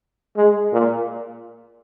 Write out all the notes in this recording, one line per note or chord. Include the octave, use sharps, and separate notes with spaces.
G#3
A#2